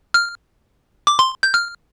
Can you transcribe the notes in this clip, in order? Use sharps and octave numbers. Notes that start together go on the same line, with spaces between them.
F6
D6
C6
G6
F6